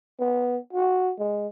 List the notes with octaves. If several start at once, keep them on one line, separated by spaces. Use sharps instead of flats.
B3
F#4
G#3